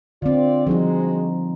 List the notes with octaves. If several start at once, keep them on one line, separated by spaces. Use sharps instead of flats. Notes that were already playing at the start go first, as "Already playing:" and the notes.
D3 C4 F4 D5
F3 G3 G#3 D#4 F#4 G#4